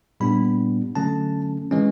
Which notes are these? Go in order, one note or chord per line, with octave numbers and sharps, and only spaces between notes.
A#2 G3 B3 D4 B5
D3 F#3 A3 C#4 A5
E3 G#3 C#4